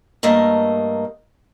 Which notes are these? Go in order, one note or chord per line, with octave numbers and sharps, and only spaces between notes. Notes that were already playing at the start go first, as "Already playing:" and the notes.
G2 A3 A#3 D#5